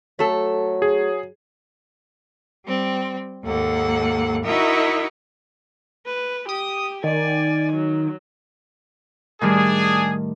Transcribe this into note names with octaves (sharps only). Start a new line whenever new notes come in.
F#3 A3 A4
G#4
G3 C4
D#2 G#2 A#3 A4 F#5
D#4 E4 F#4 A#4 D#5 E5
B4
G4 D#6
D#3 D5 G#5
F#3
A2 D#3 G3 D4 G#4